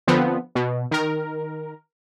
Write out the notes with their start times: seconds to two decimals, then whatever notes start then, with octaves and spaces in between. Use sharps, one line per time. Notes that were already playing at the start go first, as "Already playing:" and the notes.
0.07 D3 F3 B3 C4
0.55 B2
0.91 D#3 A#4